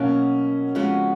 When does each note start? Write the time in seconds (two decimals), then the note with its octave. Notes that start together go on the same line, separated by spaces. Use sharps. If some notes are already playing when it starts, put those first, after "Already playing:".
Already playing: B2 F#3 A#3 C#4
0.75 F2 C#3 G#3 B3 F#4